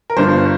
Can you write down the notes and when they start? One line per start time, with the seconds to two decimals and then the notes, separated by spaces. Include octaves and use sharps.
0.10 A#4
0.16 G1 G2 F3 C5